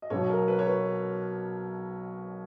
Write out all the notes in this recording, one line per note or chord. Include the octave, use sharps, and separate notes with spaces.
D#5
B1 B2 F#3 C#5
A#4
B4
C#5
B4